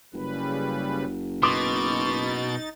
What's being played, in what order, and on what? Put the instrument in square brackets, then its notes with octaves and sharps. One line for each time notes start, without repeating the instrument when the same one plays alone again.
[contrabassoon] F#1 [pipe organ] C#3 G3 B4
[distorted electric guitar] B2 [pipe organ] D#4 A6 [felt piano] C6 D6